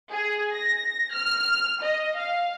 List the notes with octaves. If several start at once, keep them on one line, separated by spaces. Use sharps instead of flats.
G#4
A#6
F6
D#5
F5